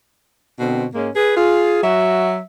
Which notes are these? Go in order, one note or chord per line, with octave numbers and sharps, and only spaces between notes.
B2 D3 C4
G#2 G#3 A#3 C#4
G#4 B4
F4 G#4
F#3 F#4 E5